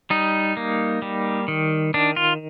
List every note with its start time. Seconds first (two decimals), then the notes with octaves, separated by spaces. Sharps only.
0.10 G3 D#4
0.57 A#3
1.02 G3
1.48 D#3
1.94 D#3 D4
2.16 F4